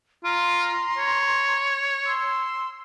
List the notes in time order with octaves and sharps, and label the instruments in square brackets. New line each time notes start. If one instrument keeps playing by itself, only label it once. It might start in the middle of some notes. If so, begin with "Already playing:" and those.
[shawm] F4 [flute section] A#5 C6
[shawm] C#5
[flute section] C6 E6